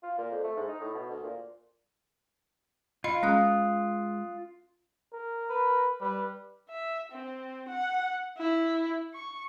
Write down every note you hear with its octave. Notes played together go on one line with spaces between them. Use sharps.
F4
A#2
F2
A3
G#2
D#4
A2
B2
D2
A#2
F4 D#5 F5 B5
G#3 C#4 F5 D#6 F#6
A#4
B4
G3 B4
E5
C4
F#5
E4
C#6